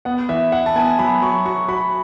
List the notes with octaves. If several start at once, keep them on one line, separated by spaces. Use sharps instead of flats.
B3 F#5
E3 E5
E4 F#5
A5
B3 G#5
F#3 B5
F#3 C#6
F#4 C#6
F#4 B5